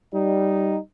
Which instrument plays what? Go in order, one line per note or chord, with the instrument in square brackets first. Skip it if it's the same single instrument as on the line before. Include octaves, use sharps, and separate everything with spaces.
[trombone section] G3 D#4